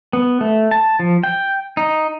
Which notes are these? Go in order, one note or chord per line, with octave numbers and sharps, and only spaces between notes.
B3
A3
A5
F3
G5
D#4